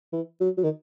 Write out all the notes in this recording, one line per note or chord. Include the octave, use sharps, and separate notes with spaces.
E3
F#3
F#3
D#3